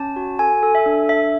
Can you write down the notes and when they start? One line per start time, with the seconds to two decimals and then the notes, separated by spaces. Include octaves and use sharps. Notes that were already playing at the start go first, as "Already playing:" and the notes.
Already playing: C#4 A5
0.16 F#4
0.39 A4 G#5
0.63 A4
0.75 E5
0.86 D4
1.09 D4 E5